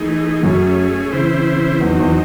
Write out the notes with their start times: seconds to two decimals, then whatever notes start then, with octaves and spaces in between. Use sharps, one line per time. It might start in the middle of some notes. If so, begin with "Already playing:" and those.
Already playing: E3 A3 D#4 G#4
0.43 F#2 A3 C#4 G#4
1.12 C#3 E3 C4 E4 C5
1.81 E2 F#3 C4 D#4
1.99 E2